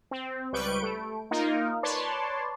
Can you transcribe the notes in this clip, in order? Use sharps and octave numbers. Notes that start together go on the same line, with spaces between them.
C4
C#2 G3 B4 C#6 G6 D7
A3
A#3 D#4 F4 A#4
B4 C#5 D5 A5 C6